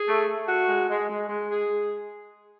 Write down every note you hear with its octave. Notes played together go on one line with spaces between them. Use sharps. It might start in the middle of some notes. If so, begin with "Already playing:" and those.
Already playing: G#4
A3
A3
F#4
G#3
G#3
G#3
G#3
G#4